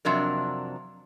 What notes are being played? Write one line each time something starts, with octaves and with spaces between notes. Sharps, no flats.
F2 C3 F#3 D4 A#4